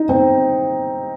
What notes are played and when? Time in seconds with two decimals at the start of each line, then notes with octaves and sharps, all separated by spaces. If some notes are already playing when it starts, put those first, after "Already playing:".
Already playing: D#4
0.09 C4